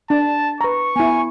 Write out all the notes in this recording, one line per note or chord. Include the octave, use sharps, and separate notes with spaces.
D4 A5
B4 A#5 C#6
B3 E4 G#5